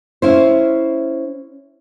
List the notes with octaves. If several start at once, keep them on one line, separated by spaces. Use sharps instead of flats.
C#4 E4 C5